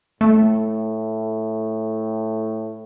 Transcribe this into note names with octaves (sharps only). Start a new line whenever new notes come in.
A2 A3